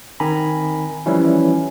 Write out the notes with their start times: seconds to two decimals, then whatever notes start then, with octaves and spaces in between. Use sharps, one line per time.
0.20 D#3 C4 G#5 A#5 B5
1.06 E3 F3 G3 C#4 E4